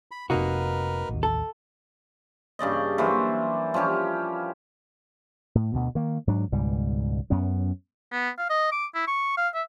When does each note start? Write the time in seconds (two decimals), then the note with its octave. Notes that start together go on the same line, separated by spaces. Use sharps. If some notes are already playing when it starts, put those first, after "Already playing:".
0.11 B5
0.30 F1 C3 A#3 D#4 F#4 A#4 B4
1.09 A1 D#2
1.23 A4
2.59 G2 C#3 D5 D#5
2.98 E3 F#3 A#3 C5
3.74 F3 G3 C#4 G4
5.55 A2
5.74 D2 B2
5.95 D#3 A#3
6.27 G#2 F#3 D4
6.52 C#2 G#2 B2 G3
7.30 F#2 B3 C#4
8.12 B3
8.38 F5
8.50 D#5
8.72 D6
8.95 E4
9.07 C#6
9.37 F5
9.55 E5